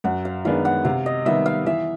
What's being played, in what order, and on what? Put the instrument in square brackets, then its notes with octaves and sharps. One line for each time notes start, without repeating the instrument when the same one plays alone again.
[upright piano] F#2 [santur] F#5
[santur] F5
[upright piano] D#3 G#3 B3 D4 [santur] F5
[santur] F#5
[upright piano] C3 [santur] F5
[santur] D#5
[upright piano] D#3 G3 B3 [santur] E5
[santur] F5
[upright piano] E3 [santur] E5